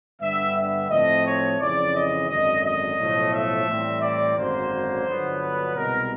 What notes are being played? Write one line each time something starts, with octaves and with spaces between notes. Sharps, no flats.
G2 D3 G3 B3 E5
E5
A2 F3 A3 C4 D#5
C#5
F2 C#3 E3 D5
D#5
G#1 F#2 D3 D#5
D#5
B1 A2 F3 A3
E5
A2 E3 G3 C4
D5
G#1 F#2 D3 F#3 A#3 C5
G1 G2 D3 F#3 B3
B4
C2 B2 G#3 B3 A#4